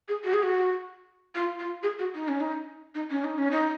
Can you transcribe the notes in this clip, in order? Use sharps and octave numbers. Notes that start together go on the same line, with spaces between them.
G#4
F#4
G#4
F#4
F4
F4
G#4
F#4
D#4
C#4
D#4
D#4
C#4
D#4
C#4
D#4